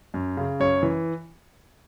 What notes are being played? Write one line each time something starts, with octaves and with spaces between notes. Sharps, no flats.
F#2
C#3
F#2 C#5
E3